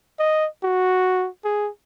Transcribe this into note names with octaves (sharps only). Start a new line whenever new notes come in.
D#5
F#4
G#4